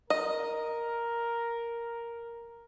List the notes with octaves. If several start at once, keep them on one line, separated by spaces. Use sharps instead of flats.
A#4 D#5